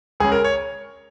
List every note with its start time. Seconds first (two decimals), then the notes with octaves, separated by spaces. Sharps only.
0.20 C#2 G#4
0.24 C#3
0.32 A#4
0.44 C#5